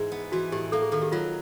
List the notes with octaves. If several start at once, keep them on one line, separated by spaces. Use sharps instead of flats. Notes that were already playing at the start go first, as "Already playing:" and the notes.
Already playing: G#2 E3 G#3
B3
E3 F#4
A2 G4
A#3 A4
G#4
D#3 A4
G4
F#3 F4